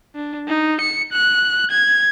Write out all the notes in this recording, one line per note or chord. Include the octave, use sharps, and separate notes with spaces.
D4
D#4
C#7
F#6
G#6